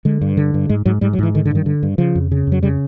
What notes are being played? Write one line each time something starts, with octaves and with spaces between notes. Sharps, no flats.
D3 G#3
G2
D3
G2
G#2 G#3
G#2 F#3
G#2 G3
F#3
G#2 E3
D3 D#3
D3
G2 D#3
D3
G2
C#3 F3
F2
C#3
F2 F#3
C#3 G3